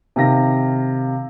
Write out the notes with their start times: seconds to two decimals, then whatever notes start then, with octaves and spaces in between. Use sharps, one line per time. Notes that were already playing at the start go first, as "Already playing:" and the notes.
0.16 C3 D#3 F5 A#6